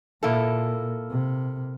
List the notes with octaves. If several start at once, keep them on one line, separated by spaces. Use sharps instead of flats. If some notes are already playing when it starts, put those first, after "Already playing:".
A#2 A#3 E4 A4
C3